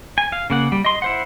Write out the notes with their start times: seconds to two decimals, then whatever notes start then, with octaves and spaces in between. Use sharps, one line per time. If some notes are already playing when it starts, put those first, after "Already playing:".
0.18 G#5
0.32 F5
0.50 C#3 A#3 F#5
0.72 G3
0.85 D#5 C6
1.02 E4 C5 F#5